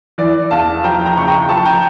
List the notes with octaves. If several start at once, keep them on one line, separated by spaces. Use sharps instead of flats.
E3 D5
E2 F5 A5
F3 G5 A#5
G5 A#5
C#2 C#6
G5 A#5
F3 A5 C#6
G5 A#5